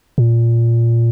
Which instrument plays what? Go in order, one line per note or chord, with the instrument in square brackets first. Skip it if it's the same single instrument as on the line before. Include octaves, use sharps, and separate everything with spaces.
[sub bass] A#2